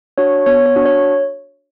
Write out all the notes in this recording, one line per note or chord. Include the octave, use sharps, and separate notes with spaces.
D4 F#4 C#5
B3 C#5
C#5
D4 F#4
C#5